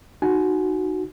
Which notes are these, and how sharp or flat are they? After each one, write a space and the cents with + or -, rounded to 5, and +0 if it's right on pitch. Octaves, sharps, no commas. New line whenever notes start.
D#4 -5 F#4 +0 G#5 +25